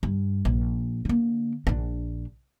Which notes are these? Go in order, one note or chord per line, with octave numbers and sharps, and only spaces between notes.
G2
A#1
D3 A#3
A#1 D4